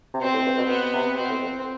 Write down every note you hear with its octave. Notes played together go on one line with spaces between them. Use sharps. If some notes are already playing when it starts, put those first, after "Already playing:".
C3
B2 C4
A2
G2
B2
B2 B3
C3
B2 C4
A2
F2